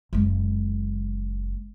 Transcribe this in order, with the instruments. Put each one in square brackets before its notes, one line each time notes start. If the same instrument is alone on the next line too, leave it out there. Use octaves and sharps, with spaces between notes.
[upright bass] F#1 G#3